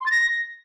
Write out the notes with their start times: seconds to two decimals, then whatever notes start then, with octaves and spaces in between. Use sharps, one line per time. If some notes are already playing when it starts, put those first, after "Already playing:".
0.01 C6
0.06 A6
0.11 A#6